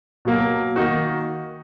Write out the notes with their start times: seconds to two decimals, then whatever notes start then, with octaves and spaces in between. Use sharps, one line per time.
0.25 B2 F#3 A#3
0.76 D#3 A#3 D#4 F#4